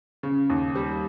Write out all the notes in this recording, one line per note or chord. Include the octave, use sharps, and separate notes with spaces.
C#3
D#2
G3